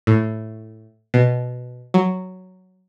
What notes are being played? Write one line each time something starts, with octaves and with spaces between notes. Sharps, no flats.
A2
B2
F#3